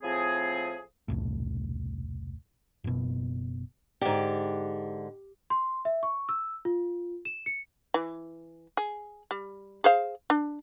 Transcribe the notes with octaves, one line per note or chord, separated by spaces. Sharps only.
A2 F3 C4 G#4
E1 C2 A2
F#1 B2
G#2 D3 G4
C6
E5
C#6
E6
F4
E7
C#7
E3
G#4
G3
G#4 C5 F5
D4